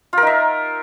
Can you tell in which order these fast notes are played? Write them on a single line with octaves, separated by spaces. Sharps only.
F4 A#4 D#4 E5